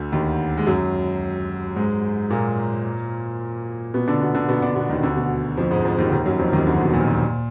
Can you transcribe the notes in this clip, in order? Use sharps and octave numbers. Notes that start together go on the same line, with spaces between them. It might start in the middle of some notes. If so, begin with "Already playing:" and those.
Already playing: D2 D3
D#2 D#3
G#3
F#2 F#3
G#2 G#3
A#2 A#3
B2 B3
D3 D4
B2 B3
D3 D4
B2 B3
D3 D4
B2 B3
D#2 D#3
D2 D3
B2
F2 F3
G#2 G#3
F2 F3
D#2 D#3
D#2 D#3
F#2 F#3
F2 F3
D#2 D#3
D2 D3
B2
A#2
A#2